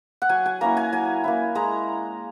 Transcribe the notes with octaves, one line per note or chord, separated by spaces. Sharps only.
F#5
F#3 G#5
G#5
A#3 C#4 E4 A#5
G#5
F#3 G#5
A#3 C#4 E4
G#3 A#5